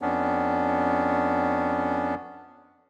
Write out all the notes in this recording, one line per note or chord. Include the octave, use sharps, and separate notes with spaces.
F2 B3 C#4 D4